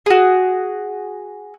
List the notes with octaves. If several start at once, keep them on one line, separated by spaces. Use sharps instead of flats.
F#4 G#4